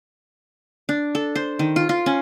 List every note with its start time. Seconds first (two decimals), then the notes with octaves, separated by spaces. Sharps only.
0.89 D4
1.15 A4
1.35 C5
1.59 D#3
1.76 F4
1.89 F4
2.06 C#4